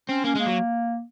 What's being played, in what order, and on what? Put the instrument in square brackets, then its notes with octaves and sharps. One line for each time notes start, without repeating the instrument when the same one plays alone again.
[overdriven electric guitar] C4 [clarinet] C#4
[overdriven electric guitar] A#3 [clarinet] C#4
[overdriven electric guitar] G#3 [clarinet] A#3
[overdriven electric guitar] F#3